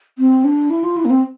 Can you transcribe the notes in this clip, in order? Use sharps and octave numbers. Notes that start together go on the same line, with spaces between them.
C4
D4
E4
F4
E4
A#3
C4